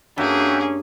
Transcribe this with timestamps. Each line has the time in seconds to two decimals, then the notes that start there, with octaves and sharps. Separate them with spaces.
0.18 G2 A#3 C#4 F#4 G#4 E5 G5